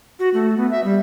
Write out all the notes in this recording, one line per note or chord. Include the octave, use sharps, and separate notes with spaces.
F#4
A3
B3
E5
G3